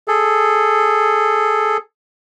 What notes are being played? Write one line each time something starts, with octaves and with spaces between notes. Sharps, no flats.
G#4 A4